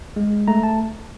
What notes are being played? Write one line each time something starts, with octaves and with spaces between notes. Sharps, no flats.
G#3
A3 A#5
A5